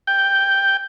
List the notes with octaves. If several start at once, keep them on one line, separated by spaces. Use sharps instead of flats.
G5